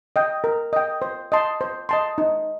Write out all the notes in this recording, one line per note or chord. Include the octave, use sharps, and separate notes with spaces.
D#5 G5
A#4
D#5 G5
C5
D#5 A5 C6
C5
D#5 A5 C6
D#4